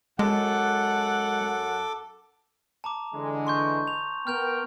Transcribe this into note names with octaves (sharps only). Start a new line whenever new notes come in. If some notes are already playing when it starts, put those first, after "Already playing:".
F#2 G#3 A4 F#5 D6
A5 A#5 D6
D3 E3 G#3
C6 C#6 G6
F7
B3 A#4 G5 F6 G6 F7